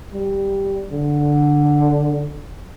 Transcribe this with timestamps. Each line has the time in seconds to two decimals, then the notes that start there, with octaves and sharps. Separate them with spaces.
0.13 G3
0.91 D3